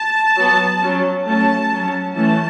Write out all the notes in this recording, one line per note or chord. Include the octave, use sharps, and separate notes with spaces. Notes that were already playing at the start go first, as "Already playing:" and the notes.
Already playing: A5
F#3 B3
F#3 C#4
F#3 A3 C#4 A5
F#3 C#4
E3 A3 C#4 A5